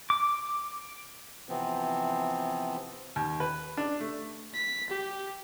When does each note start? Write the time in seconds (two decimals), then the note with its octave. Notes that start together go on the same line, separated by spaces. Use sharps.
0.10 D6
1.49 C3 E3 F3 B3 C4
3.16 D#2
3.40 B4
3.77 D4
4.01 A3
4.54 B6
4.90 G4